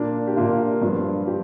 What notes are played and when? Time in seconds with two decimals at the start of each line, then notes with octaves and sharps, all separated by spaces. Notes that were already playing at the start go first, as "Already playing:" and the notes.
Already playing: A#2 A#3 D4
0.27 G4
0.36 A#2 A#3 D4 F4
0.82 G2 F3 D4
1.27 F3 D4 G4